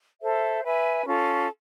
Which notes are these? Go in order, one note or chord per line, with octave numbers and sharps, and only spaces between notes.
A4 C5 E5
B4 E5 G#5
C#4 F4 A4